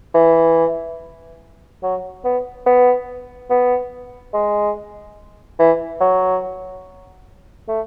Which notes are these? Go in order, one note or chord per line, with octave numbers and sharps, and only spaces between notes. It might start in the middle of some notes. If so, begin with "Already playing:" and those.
E3
F#3
B3
B3
B3
G#3
E3
F#3
A3